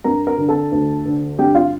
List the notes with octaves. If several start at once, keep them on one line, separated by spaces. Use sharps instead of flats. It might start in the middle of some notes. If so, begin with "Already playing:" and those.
G2 A#4 A#5
A#4 A#5
D3
A4 A5
D2
D3
G2 G4 G5
F4 F5